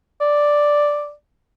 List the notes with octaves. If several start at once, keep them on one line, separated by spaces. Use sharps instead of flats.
D5